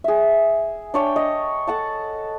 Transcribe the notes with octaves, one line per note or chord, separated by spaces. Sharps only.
G#4 E5
D4 C#5 G5
D#5
A4 F#5 A5